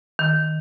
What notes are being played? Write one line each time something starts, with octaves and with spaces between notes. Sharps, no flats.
D#3